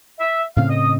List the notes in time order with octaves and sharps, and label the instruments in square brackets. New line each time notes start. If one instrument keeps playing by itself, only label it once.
[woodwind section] E5
[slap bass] A2 C#3 C4 [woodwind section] F5
[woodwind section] D#5 D#6